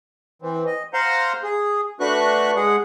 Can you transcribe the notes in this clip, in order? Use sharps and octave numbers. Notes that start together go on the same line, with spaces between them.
E3 C4
D#5
C5 F5 F#5 A#5 C6
G#4
A3 D4 F#4 B4 C#6 F#6
G#3 G#4 F#5